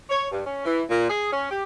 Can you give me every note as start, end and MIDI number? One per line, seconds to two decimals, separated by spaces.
0.10 0.26 73
0.31 0.41 43
0.46 0.63 61
0.66 0.82 52
0.89 1.09 46
1.10 1.28 68
1.32 1.47 61
1.51 1.63 67